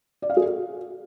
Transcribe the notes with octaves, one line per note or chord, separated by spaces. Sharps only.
D5
F5
G#4
F#4